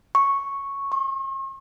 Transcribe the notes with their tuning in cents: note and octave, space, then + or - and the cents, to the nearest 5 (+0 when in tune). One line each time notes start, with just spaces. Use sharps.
C#6 -5
C#6 -45